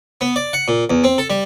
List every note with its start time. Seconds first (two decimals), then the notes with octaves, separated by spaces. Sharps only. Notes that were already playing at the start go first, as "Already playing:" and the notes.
0.21 B3
0.36 D5
0.53 F#5
0.68 A#2
0.90 E2
1.04 C4
1.18 A4
1.30 G3